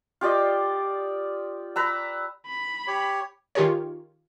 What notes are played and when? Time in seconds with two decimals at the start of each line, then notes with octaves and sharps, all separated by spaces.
0.21 F4 G4 D5 D#5
1.76 B4 A#5 E6
2.46 B5
2.87 G4 C#5
3.55 D#3 F4 G4 G#4 A#4 C#5